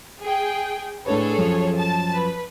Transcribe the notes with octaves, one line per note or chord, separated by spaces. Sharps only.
G#4 G5
A2 D4 G#4 A4 B4 C#5
F#2 F3 C#4
A5
B4